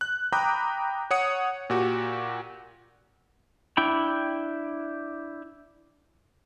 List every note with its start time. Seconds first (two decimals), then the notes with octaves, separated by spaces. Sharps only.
0.01 F#6
0.33 G5 A#5 B5 D6 D#6 G6
1.11 C#5 F#5 D#6 C#7
1.70 A#2 F#4 G4
3.77 D4 E4 G5 B5